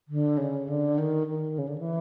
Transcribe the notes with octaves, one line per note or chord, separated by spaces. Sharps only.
D3
C#3
D3
D#3
D#3
C#3
D3
E3